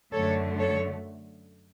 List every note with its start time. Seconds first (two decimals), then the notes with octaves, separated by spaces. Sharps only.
0.13 F#2 D3 A3 A4 C#5
0.58 A4 C#5